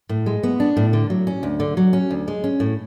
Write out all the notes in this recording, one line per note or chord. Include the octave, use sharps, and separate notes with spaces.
A2
G#3
B3
D4
A2
D3
F#3
C#4
D2
D3
F#3
C#4
D2
G#3
C#4
A2